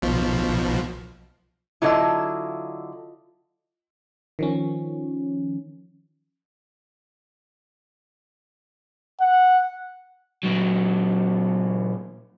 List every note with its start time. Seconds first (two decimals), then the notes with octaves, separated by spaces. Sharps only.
0.02 B1 B2 F3
1.82 D3 F#3 E4 F4 D#5 E6
4.39 D#3 F3 C#4
9.21 F#5
10.44 A#2 F#3